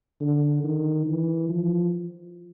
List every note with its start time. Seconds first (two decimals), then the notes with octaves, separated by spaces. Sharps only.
0.21 D3
0.64 D#3
1.06 E3
1.49 F3